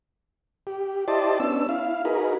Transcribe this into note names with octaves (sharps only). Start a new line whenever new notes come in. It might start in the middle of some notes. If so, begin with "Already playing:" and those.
G4
E4 G4 C5 D5 D#5 A5
B3 C#4 D4 E6
E4 F5
D#4 F#4 G#4 A#4 B4